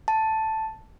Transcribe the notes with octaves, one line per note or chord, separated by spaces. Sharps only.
A5